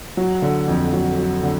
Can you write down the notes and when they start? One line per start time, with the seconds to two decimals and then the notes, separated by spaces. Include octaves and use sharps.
0.17 F#3
0.42 D3
0.68 F2
0.93 F#3
1.18 F#3
1.43 D3